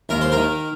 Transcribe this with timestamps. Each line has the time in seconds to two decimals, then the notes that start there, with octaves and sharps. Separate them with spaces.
0.09 D#2 A#4
0.21 C5
0.32 D#3 A#4